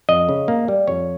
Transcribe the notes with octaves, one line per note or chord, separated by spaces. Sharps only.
F2 D#5
C#3
A#3
G3
F2 C#5